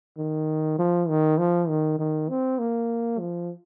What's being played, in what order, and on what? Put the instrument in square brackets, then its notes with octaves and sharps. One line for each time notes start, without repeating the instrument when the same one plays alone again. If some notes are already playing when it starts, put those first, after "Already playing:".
[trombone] D#3
F3
D#3
F3
D#3
D#3
C4
A#3
F3